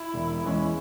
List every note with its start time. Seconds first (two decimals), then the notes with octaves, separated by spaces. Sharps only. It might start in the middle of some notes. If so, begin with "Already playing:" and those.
Already playing: E4
0.14 E1
0.43 E2 E3 G#3 C#4